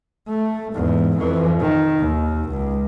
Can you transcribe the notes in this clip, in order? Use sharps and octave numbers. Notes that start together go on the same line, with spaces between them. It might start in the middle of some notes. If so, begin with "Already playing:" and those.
A3
E2 G#2
F2 E3
D#3
D#2
C#2